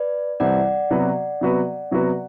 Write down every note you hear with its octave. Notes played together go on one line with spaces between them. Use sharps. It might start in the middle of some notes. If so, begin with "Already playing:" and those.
Already playing: B4 D5
C2 C3 E3 G3 C4 D5 F#5
C3 F#3 B3 F#4 B4
C3 F#3 B3 F#4 B4
C3 F#3 B3 F#4 B4